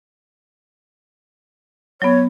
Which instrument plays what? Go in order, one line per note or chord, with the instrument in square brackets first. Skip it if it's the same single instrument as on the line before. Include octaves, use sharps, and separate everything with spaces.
[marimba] F#3 B3 [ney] C#5